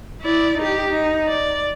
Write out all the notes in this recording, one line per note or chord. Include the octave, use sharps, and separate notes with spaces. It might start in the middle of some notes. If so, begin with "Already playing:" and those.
E4 D5
D#4 G4
D#4
D5